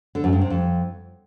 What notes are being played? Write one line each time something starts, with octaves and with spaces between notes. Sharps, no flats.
D3
F#2
G2
C3
F2